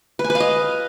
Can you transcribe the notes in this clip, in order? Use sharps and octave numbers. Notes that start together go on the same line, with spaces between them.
B4
G#5
B4
F5
D#5